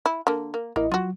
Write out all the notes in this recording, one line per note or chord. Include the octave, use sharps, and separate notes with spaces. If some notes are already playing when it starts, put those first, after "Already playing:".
E4
D3 A#3
A#3
A1 A#3 E4 D#5
F#3 F4 F#4